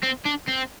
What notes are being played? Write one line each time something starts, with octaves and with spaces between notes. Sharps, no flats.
C4
D4
C4